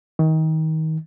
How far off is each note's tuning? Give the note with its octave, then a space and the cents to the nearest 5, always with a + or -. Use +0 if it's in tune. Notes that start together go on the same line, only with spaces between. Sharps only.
D#3 +25